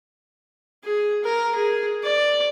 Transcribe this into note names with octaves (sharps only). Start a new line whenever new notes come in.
G#4
A#4
G#4
D5